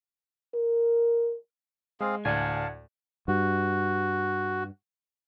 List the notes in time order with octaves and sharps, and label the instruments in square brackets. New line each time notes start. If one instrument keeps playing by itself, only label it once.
[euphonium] A#4
[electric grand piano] G#3 [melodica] C4 G#4 F5
[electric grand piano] D2 [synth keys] A2 D5 [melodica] F5 A5 [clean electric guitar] F#5 G#5
[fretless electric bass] G2 [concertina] F#4